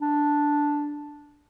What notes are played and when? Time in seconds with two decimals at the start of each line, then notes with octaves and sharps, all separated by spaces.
0.01 D4